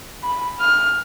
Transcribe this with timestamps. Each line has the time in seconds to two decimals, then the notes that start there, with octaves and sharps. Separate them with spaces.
0.23 B5
0.60 F6